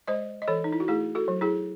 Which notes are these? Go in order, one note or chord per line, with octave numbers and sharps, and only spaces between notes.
G#3 C5 D#5
D#5
E3 A4 C#5
D#4
E4
F#4
A3 E4 G#4
F#4 A4
F#3
E4 G#4